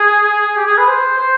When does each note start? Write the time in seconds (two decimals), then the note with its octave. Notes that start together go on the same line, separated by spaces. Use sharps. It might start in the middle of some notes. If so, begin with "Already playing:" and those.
Already playing: G#4
0.56 G4
0.67 G#4
0.77 B4
0.87 C5
1.18 C5